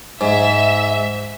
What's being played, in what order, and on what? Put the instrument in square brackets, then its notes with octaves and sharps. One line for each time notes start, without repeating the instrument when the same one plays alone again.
[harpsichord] G#2 [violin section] E5